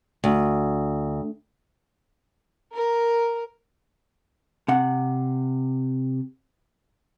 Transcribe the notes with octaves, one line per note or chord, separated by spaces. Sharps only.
D2
A#4
C3 F#5